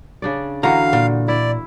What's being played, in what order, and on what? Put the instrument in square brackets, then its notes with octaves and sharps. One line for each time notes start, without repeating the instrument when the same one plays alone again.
[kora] C#3 D4 D5
[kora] D3 E3 F#4 [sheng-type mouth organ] F5 [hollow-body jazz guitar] A#5
[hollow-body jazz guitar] A#2
[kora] E4 [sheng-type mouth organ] D5